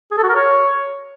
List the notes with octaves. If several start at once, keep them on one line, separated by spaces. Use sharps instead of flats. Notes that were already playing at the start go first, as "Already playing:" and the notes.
G#4
A4
F#4
A#4
C#5